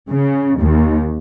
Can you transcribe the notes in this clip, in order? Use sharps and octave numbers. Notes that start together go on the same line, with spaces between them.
C#3
D#2